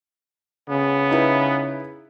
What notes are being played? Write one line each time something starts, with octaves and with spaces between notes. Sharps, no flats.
C#3 B3
D#4 E4 B4